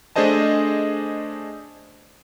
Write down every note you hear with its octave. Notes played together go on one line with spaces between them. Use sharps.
A3 D4 G#4 C5 D#5 A5